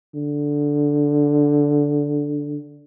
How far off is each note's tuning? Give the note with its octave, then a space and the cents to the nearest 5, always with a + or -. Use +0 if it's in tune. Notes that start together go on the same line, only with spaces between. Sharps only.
D3 -5